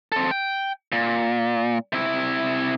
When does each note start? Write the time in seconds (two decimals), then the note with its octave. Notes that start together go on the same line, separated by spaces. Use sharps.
0.12 C4 A4
0.31 G5
0.92 A#2
1.93 C3 E4